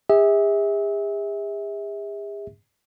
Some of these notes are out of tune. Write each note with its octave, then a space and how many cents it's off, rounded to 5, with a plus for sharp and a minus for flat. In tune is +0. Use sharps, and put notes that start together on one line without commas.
G#4 -45 E5 -30